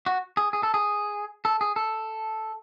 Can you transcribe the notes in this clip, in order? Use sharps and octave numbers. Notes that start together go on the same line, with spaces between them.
F#4
G#4
G#4
A4
G#4
A4
G#4
A4